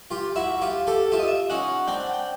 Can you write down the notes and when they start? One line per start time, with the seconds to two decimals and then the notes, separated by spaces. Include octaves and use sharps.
0.11 F4 G4
0.36 E4 F#4 E5
0.61 F4 G4
0.87 G4 A4
1.11 F4 G4 E5
1.19 D#5
1.28 E5
1.50 C#4 D#4 F#5
1.87 C4 D4 G5
2.00 F#5
2.13 G5